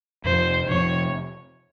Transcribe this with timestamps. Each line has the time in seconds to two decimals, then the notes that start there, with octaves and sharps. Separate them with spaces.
0.24 F2 C3 F3 C5
0.69 F2 C3 F3 C#5